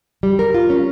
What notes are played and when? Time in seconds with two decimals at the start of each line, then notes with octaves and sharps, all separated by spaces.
0.23 G3
0.39 A#4
0.54 F4
0.70 C#4